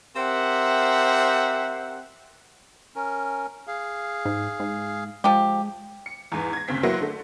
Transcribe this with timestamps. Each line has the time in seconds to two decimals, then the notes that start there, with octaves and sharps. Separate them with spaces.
0.16 C4 G4 A#4 C5 E5 F#5
2.96 C#4 A#4
3.67 G#4 F5
4.25 G#2
4.60 G#2
5.24 F3 G#3 G4
6.06 C#7
6.32 E2 G#2 E3
6.53 G#6 A#6
6.68 F#1 D2 C#3 C4 B6
6.83 F#3 A#3 E4 F#4 B4 C5
7.01 D3 A3